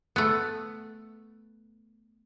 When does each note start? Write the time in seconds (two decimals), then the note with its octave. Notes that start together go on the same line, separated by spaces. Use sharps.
0.16 A3 B3